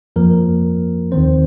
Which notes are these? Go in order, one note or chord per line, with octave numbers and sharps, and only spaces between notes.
F2 F3 A#3 A#4
D#2 D#3 C4 C5